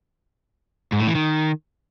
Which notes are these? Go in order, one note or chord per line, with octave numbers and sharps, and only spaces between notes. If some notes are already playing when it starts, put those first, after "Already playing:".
G#2
A2
E3
D#3